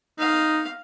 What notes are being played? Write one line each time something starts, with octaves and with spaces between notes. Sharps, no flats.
D#4 F5